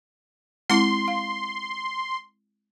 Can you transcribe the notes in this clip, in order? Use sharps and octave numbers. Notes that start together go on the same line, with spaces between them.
G#3 C4 E4 C6
F5